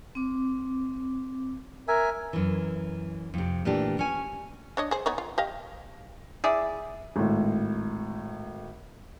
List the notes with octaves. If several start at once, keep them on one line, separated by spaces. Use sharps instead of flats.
C4 D6
A#4 E5 G#5
F#2 E3
F2 C3
A#2 E3 A3 D4 G4
C#4 G#5
D4 C#5 D#5
G#4 C5
B3 D#4 C#5
F4
G4 D#5 F5
E4 G#4 D5
G#1 A2